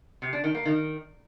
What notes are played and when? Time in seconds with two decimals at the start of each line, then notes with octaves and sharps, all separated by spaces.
0.22 C3
0.33 D4
0.44 D#3
0.55 A#3
0.65 D#3